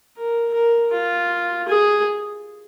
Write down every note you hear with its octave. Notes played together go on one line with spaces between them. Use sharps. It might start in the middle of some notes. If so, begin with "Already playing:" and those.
A#4
A#4
F4
G#4